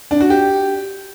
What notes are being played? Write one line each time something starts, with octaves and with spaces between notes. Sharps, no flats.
D4
F#4
G4